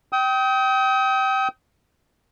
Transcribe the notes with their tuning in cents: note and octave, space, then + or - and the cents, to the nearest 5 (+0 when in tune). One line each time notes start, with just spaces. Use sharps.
G5 -20 D#6 +35